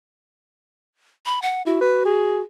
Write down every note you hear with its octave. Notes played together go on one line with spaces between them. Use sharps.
B5
F#5
E4 F#4
B4
G#4